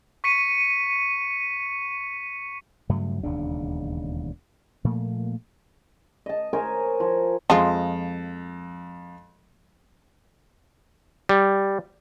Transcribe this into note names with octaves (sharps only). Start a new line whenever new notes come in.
C#6 B6 C#7 D#7
G2 C#3 F#3 A3
E1 D#2 C#3 D4
A#2 F3 A3 A#3
D#5 A5
A#4 C5 C#5 G#5
F3
F2 F3 G#3 F4
G3